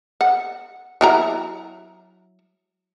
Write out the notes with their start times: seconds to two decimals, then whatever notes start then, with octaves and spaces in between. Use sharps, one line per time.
0.21 F#5
1.01 F#3 E4 A#5